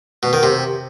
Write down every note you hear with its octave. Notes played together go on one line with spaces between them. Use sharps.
B2
D#3
C3